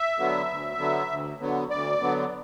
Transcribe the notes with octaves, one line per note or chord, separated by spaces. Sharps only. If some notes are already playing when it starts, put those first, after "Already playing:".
Already playing: E5
D3 F#3 B3
D2
D3 F#3 B3
D2
D3 F#3 B3
D2 D5
D3 F#3 B3